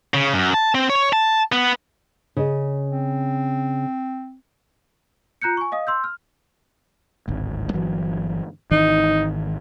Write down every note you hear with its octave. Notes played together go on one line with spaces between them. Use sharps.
C#3
F#2
A5
C4
C#5
A5
B3
C#3 D#5
C4
F4 A#5 F#6 G6 C#7
G#5 C#6
D#5 F5 D#6
C6 E6 G6
F6
D1 G#1
G1 E3 F#3
G#1 D#3 E3 D#4